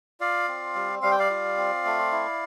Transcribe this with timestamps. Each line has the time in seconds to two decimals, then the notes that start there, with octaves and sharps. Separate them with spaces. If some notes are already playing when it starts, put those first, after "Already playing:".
0.20 F4 D5 F5
0.48 C4
0.75 G3
1.02 G3 F5
1.11 G5
1.19 D5 F5
1.30 F4
1.57 C4
1.85 A3
2.12 E4